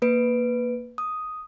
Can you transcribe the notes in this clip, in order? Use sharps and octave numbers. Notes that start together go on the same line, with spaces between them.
A#3 B4 D7
D#6